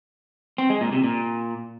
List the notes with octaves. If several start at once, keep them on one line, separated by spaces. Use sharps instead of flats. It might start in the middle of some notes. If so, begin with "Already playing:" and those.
C4
G#3
A#2
C3
A#2